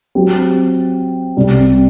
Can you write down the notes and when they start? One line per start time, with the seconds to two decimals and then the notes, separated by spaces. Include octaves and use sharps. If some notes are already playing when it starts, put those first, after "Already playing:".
0.15 F#3 C4 G4
1.37 C2 C3 G3